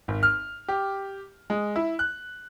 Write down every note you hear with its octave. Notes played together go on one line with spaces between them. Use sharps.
G#1
F6
G4
G#3
E4
F#6